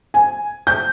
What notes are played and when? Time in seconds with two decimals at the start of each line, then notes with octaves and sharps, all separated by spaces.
0.14 G#5
0.67 G6